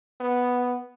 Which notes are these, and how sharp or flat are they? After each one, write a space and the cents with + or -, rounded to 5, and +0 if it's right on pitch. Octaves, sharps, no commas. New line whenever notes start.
B3 +0